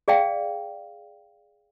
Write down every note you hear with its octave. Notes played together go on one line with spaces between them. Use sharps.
G#4 D5 F5 G5